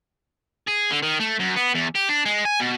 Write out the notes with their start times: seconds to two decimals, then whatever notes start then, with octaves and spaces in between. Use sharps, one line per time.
0.68 G#4
0.91 D3
1.03 D#3
1.20 A3
1.40 F#2
1.57 B3
1.75 E2
1.95 G4
2.09 D4
2.25 G#3
2.45 G#5
2.60 B2